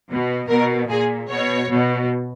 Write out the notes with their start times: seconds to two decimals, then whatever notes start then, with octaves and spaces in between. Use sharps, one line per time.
0.09 B2
0.49 B2 A#4
0.89 A#2 G#4
1.29 B2 C#5
1.70 B2